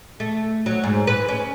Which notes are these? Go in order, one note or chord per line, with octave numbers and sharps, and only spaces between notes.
A3
F#3
G#2
B4
C#4